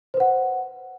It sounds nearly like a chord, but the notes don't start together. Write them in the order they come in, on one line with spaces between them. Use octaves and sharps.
C5 B4 F#5